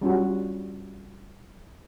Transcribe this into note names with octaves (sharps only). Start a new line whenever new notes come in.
G3 C#4 F4 F#4